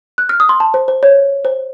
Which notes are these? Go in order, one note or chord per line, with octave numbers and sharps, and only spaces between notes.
F#6
F6
D#6
C6
A5
C5
C5
C#5
C5